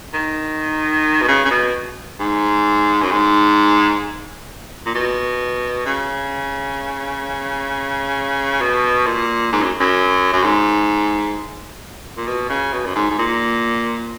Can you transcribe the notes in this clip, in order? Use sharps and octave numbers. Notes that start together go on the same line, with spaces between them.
D#3
B2
C#3
C#3
B2
G#2
F#2
G#2
A#2
B2
C#3
B2
A#2
G#2
F#2
F#2
F#2
G#2
A#2
B2
C#3
B2
F#2
G#2
G#2
A#2